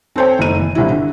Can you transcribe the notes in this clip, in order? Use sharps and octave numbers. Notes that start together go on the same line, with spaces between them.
C4 A4 C5 C#5 G5
F#1 A3 D#4 D#7
E3
G1 C2 C3 E4
D3